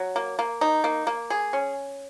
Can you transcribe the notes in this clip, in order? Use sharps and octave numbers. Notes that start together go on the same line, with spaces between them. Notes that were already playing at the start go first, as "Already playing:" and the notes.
Already playing: F#3
A#3
A#3
D#4
A#3
A#3
G#4
C#4